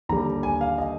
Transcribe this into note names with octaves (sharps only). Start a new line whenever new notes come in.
D#2 D3 G3 A#5
G#5
F5
D#5